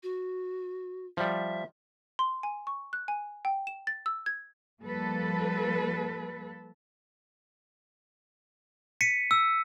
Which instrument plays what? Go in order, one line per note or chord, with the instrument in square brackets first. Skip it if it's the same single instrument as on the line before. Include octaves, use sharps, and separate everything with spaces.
[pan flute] F#4
[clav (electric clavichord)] F3 G3 [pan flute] E5
[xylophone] C6
G#5
C#6
F#6
G#5
G5
E7
A6
E6
G#6
[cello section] F3 G3 A#3 A4 B4
[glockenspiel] B6 C#7 D#7
E6